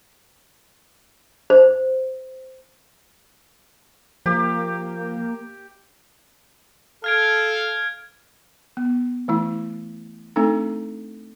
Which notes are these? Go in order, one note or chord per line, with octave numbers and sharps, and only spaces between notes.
C5
F3 A#3 G4
A4 F5 F6 G#6 D7
B3
E3 A3 E4
A3 C4 D4 D#4 A4